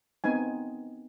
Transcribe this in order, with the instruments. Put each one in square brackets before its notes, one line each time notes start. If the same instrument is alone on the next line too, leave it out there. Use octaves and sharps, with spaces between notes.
[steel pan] B3 C4 D#4 G#5